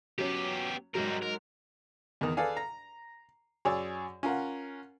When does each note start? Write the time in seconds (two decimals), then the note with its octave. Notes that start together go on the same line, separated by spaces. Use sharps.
0.18 F#3 B3 C#4 G4
0.95 G#2 F#3 G3 A#4
1.23 A#4
2.21 E2 D#3
2.37 G#4 A4 B4 D5 F5 G#5
2.57 A#5
3.65 F#2 G#4 C#5 D5 E6
4.23 C#4 F4 A#4 F#5